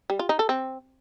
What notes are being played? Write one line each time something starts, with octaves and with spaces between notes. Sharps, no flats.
G3
F4
D#4
A4
C4